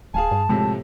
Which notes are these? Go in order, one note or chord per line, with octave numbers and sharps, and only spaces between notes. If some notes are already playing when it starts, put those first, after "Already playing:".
D1 G#4 F5 G#5 A5
G2
A2 C3 F3 G#3